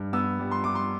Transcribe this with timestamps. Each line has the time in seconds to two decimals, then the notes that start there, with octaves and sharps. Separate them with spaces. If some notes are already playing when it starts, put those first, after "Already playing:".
Already playing: G2
0.13 B3 E6
0.39 G3
0.51 C6
0.64 G3 D6
0.75 C6